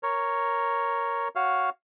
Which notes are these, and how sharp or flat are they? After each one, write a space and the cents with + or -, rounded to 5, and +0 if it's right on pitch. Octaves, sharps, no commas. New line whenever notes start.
A#4 +0 C#5 +0
F#4 +0 C#5 +0 F5 +0